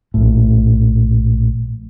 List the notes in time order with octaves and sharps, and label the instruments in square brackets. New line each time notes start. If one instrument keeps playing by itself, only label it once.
[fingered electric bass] A#1 A2